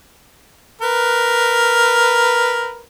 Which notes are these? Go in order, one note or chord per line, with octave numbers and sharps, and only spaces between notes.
A#4 B4